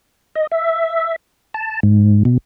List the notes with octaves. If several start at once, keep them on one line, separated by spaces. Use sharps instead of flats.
D#5
E5
A5
G#2
B2